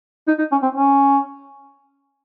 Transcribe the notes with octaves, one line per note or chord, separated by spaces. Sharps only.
D#4
D#4
C#4
C4
C#4